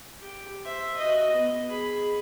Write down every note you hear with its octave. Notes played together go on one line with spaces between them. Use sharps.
G4
C5 E5
F#4 D#5
B3
G#4 B5